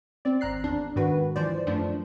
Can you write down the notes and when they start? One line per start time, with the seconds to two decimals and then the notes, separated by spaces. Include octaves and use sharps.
0.25 C4 D5
0.41 G#1 A#5 F#6 C7
0.64 E2 D4
0.96 G#2 D#3 F#4 B4
1.36 E3 F3 C5 D5
1.67 F#2 F3 A3 D4